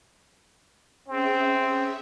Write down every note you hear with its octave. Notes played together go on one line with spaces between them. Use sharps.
C4 C#4 G#4 E5